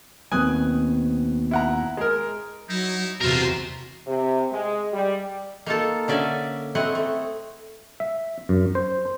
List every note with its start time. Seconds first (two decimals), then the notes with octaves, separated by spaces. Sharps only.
0.32 D#2 B2 C4 G#5 D#6 F#6
1.51 E4 F#5 A#5
1.97 G#3 A#4
2.69 F#3 D#4 E4
3.21 E2 C3 F4 F#4 A#4 C5
4.07 C3
4.51 G#3
4.93 G3
5.66 A#3 D#4 F4 A4
6.08 D3 C#4 D5 E5 G#5
6.75 A3 C4 E4 D#5 F#5
6.95 A3
8.00 E5
8.49 F#2
8.75 C5